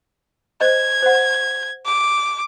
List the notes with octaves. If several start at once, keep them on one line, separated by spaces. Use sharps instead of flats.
C5 D#5 G#6
C5 F#5
D6